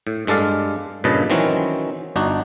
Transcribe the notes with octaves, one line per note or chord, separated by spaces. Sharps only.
A2
G2 G#3 A4 D5 F5
G2 A#2 C#3 B4 D#5 A5
D#3 E3 F#3 C4 C#4
G1 D4 D#4 F#4